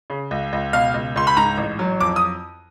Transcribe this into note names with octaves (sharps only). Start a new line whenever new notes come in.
C#3
C#2
C#2
B2 F5
C#2
C#2 C6
B5
G#2 A#5
A1
F#3
F2 D6
D#6